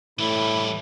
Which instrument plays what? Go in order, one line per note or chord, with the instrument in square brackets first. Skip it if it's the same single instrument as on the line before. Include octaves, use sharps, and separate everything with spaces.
[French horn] A2 [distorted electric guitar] E3 G3 [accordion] E4